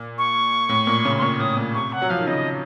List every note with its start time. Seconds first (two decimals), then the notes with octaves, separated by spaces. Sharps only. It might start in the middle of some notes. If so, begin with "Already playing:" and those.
Already playing: A#2
0.18 C#6
0.69 A2
0.87 A#2
1.05 C#3
1.18 C6
1.22 A#2 C#6
1.40 A2 D#6
1.57 A#2
1.75 C3 C#6
1.93 F#5
2.02 F#3
2.10 F3 F5
2.18 D#3
2.27 C#3 D#5